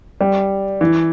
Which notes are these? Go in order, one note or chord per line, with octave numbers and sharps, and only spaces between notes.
G3
E3